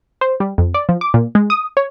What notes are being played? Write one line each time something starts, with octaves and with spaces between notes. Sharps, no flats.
C5
G3
F2
D5
F3
D6
A#2
G#3
D#6
C#5